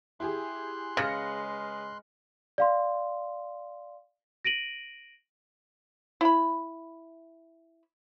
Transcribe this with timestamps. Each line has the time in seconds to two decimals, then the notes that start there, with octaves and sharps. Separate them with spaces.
0.20 E4 G4 G#4 C6 F#6
0.97 C#3 G#3 B4 F6 A#6 C#7
2.58 D5 F5 C6
4.45 A#6 D7 D#7 F#7
6.21 E4 B5